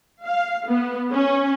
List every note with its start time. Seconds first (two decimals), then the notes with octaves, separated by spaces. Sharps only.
0.25 F5
0.68 B3
1.12 C#4